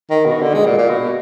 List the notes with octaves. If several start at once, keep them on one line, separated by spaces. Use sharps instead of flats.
D#3
B2
D3
G#3
A#2
A#2
B2